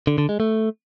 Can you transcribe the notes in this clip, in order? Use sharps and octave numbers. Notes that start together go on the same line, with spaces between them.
D3
D3
G#3
A3